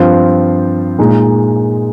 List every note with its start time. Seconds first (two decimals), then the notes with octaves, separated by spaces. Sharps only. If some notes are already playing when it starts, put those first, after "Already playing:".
Already playing: G2 F3 C4 F4 C5
0.99 A#2 G#3 D#4